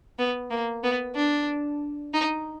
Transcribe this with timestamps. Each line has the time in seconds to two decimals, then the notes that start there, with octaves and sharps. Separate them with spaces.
0.19 B3
0.51 A#3
0.83 B3
1.16 D4
2.13 D#4